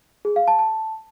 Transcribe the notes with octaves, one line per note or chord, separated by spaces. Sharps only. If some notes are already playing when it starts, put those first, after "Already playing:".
G#4
F5
A5
A5